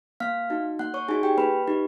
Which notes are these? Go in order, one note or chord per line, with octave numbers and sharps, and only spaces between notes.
A#3 F5 F6
D#4 F#4
A#3 F#5 F#6
C#5 C#6
D#4 F#4 G#4 G#5
G4 G5
A#3 B4 B5
D#4 G4